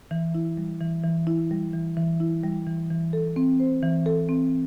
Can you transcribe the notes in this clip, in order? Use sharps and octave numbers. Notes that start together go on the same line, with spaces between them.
E3
E4
G3
E3
E3
E4
G3
E3
E3
E4
G3
E3
E3
A4
C4
C5
E3
A4
C4